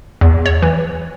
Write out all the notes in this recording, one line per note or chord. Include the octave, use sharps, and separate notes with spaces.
E2
C#5
E3